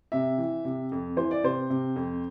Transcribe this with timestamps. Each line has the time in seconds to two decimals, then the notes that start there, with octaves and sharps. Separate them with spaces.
0.12 C3 E5
0.38 E3
0.65 C3
0.92 F2
1.17 E3 C5
1.31 D5
1.43 C3 C5
1.70 C3
1.96 F2